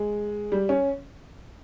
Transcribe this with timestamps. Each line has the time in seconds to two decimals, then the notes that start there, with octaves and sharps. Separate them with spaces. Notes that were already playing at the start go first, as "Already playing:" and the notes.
Already playing: G#3
0.52 G3
0.69 C#4